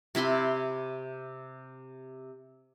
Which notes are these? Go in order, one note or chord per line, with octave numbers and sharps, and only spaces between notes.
C3 E4 B5 C6